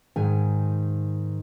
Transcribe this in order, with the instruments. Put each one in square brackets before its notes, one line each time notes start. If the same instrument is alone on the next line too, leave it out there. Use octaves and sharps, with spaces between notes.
[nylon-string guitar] G#2 D#3 G#5